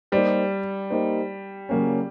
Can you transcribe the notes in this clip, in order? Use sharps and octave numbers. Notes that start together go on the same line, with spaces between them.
G3 A#3 D#4 G4 C5
A#3 D#4 G4 C5
C#3 F#3 A#3 C#4